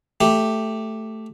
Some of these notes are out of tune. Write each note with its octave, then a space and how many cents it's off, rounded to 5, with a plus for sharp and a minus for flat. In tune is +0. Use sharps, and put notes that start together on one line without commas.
A3 +0 G4 +0